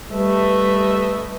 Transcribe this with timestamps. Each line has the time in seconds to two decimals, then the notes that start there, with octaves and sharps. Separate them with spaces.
0.11 G3 A3 A4 B4 D#5 E5